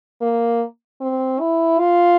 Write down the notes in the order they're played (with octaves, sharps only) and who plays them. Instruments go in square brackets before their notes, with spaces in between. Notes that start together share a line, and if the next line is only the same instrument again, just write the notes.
[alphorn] A#3
C4
E4
F4